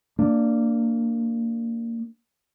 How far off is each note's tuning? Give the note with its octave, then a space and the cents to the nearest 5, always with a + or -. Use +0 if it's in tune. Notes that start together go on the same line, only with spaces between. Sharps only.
A#3 -20 D4 +0